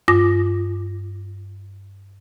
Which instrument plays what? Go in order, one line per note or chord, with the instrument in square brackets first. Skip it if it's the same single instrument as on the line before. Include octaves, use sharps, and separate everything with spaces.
[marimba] G2 F4 D6 A#6